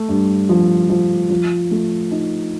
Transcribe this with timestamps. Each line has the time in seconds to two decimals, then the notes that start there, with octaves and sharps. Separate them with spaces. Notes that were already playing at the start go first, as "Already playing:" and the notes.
Already playing: A3
0.09 G2
0.49 F3
0.90 F3
1.30 F3
1.71 A3
2.12 D#4